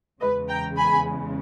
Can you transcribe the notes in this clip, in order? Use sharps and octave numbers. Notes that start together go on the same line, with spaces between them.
E2 C#3 G#3 B4 D#5
G5 A#5
G#5 B5